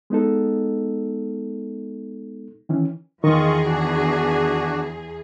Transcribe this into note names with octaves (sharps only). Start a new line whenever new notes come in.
G#3 B3 D#4 A4
D#3 E3 C#4
E2 D#3 F4 G#4 D#5 C#6
D4 F#4